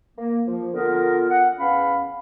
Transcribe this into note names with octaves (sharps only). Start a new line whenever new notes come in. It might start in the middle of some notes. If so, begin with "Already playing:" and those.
A#3
F3
D3 B3 F4 A#4
F#5
E2 C#4 F5 B5